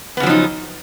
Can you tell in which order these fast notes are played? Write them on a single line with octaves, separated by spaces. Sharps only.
B3 C#3 F#3 F3 D#4